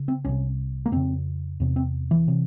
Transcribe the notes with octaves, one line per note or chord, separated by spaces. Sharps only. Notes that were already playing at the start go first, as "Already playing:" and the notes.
Already playing: C#3
C4
C2 C3 C#4
A#3
F2 C#3 C4
E2 C3
C4
E3
C3